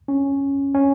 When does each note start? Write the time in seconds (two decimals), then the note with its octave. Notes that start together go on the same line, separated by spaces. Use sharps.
0.08 C#4
0.75 C#4